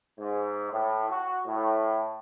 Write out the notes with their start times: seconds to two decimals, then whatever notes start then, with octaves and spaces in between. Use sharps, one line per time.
0.19 G#2
0.73 A2
1.11 F#4
1.47 A2